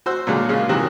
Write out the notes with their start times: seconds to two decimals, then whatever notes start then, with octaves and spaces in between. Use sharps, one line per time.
0.06 F#4 C5 E6
0.27 A#2 D3 F#3 G#3
0.49 C#3 G#3 A#3 F4
0.69 C3 D#3 E3 F#3